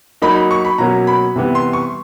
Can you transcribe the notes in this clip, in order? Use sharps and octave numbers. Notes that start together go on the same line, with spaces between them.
F#3 A#3 D#4 B5
B5
C#6
B5
B2 F#3 A#3 C#4 A#5
B5
C3 E3 G3 B3
C6
C#6